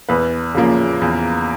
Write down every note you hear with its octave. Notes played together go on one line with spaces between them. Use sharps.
E2 B4
C#3 F3 A#3
E2